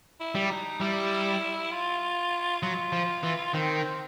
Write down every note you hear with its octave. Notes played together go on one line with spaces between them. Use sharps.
E4
G3
D#4
G3 E4
F4
F#3 F4
F3
E3
D#3 C4